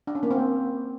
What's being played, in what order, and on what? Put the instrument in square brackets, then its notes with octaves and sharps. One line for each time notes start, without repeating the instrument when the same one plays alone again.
[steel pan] D4
C#4
A#3
C4
A#3